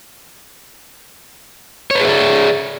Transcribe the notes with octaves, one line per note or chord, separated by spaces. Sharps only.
G#4 B4 C#5 D5 E5